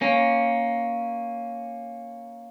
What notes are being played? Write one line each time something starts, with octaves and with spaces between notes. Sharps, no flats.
A#3 C#4